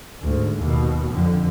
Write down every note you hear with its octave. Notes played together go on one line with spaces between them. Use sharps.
D2 G#2
D#2 B2
F2 D3